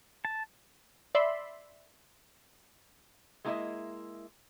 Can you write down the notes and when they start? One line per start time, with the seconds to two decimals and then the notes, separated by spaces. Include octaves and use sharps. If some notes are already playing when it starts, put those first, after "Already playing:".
0.25 A5
1.15 D5 E5 B5 C6
3.44 G#3 A#3 E4 A#4 D#5 E5